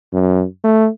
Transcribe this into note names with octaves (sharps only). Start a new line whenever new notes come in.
F#2
A3